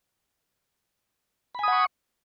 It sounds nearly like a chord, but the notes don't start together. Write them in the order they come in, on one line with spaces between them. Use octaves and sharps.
B5 G#5 D#6 F#5 C#6